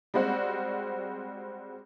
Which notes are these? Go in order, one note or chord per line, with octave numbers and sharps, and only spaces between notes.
G3 G#3 C4 F#4